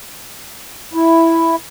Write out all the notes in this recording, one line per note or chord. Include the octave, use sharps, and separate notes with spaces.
E4